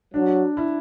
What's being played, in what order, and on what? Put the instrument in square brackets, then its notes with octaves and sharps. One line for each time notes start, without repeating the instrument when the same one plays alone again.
[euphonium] F#3 [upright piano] D4
[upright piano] E4